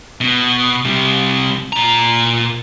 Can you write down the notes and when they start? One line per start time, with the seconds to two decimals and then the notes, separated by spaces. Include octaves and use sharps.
0.21 B2
0.85 C3 G3
1.73 A#2 A#5